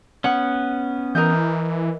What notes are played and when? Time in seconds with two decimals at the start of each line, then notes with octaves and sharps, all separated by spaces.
0.24 B3 C#4 F#5
1.15 E3 A#4 D#5 G6